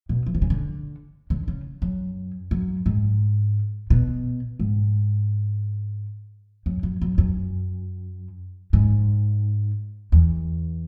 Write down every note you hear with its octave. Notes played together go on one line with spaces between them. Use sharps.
B2
E3
D3
C#3
D3
D3
C#3
F#2
F#2
G#2
B2
G#2
F#2
F#2
F#2
F#2
G#2
E2